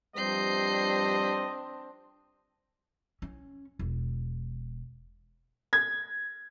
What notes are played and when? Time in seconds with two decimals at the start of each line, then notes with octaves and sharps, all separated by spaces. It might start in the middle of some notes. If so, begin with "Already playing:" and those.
0.16 G2 F3 G3 C4 D4 D#5 G6 C7
3.22 C#4
3.79 E1
5.73 G#6